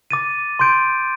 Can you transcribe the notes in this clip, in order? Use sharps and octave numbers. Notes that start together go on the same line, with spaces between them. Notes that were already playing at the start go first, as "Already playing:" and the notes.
D6 A6 D#7
C6 G6 D7